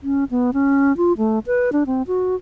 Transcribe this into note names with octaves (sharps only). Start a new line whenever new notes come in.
C#4
B3
C#4
F4
A3
B4
D4
C4
F#4